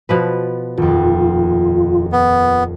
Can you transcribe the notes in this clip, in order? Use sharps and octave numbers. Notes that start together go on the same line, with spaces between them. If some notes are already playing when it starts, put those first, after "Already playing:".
B2 F3 B4
D#1 F2 F4
B3